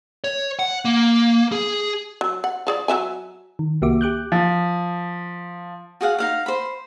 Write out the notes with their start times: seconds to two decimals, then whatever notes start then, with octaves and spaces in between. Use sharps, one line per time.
0.24 C#5
0.59 F#5
0.85 A#3
1.52 G#4
2.21 F#3
2.44 F#5
2.67 F3 G#4 D5
2.88 F#3 E5 G#5
3.59 D#3
3.82 C2 A#3 F#4 G4 E5 D6
4.01 G4 D6 F#6 G6
4.32 F3
6.01 F#4 G#4 F5 F#5
6.19 D#4 F5 F#5
6.46 C5 B5